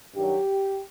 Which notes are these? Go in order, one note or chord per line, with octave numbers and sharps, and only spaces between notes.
G2 D#3 F#3 G4